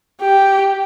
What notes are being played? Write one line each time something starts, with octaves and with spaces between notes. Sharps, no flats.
G4